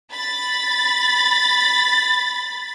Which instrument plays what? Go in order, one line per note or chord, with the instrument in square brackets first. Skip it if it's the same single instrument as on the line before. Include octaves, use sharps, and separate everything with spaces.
[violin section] B5 A6